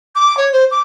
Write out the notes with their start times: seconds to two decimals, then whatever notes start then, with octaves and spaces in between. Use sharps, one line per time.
0.15 D6
0.37 C#5
0.52 C5
0.71 D6